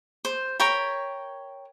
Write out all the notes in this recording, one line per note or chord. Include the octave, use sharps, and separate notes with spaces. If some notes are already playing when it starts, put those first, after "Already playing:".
C5
A#4 C#5 G5 B5